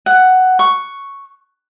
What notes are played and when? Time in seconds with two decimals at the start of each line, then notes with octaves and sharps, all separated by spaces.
0.06 F#5
0.59 C#6